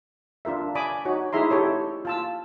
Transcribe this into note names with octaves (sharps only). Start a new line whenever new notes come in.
D4 F4 A#4 E5
D5 G#5 B5 D6 D#6
D#4 F#4 C#5
D#4 E4 G#4 E5 A#5 C6
E4 G4 A4 C#5
F4 A5 E6